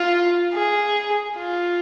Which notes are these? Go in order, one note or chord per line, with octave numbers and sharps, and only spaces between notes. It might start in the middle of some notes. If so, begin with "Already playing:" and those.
Already playing: F4
G#4
F4